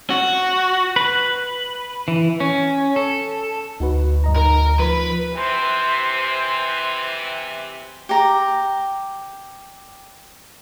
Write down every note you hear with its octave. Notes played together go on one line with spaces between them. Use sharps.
F#4
B4
E3
C#4
A4
D2 D#4 F#4 B4
G2 D#5 A#5
D#4 A#4
F3 B4
C3 E3 C5
G4 A#5